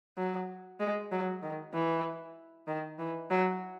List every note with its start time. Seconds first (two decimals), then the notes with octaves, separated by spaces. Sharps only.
0.17 F#3
0.80 G#3
1.12 F#3
1.43 D#3
1.73 E3
2.67 D#3
2.99 E3
3.31 F#3